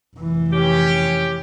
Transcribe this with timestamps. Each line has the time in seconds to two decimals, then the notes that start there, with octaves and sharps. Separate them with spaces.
0.17 F1 E3
0.53 C#4 G4